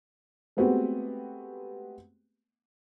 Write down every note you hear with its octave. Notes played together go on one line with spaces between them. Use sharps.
G#3 A3 B3 C4 F#4 G4